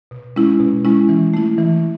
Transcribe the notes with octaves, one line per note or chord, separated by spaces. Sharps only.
B2
G#3 C#4 E4
B2
G#3 C#4 E4
E3
A3 E4
E3